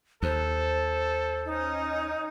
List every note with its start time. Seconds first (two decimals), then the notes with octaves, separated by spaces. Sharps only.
0.23 D#2 A4 C5
1.46 C#4 D#4